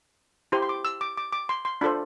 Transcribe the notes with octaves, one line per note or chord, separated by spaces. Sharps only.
E4 G4 C5 C6
C6
D6
E6
D6
D6
D6
C6
C6
D4 F4 A4 C5 B5